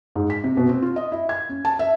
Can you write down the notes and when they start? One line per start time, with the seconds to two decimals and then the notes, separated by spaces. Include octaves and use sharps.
0.16 G#2
0.30 B6
0.44 C3
0.57 B2
0.69 C4
0.82 F4
0.96 D#5
1.12 E4
1.29 G#6
1.50 C#4
1.65 A5
1.79 E5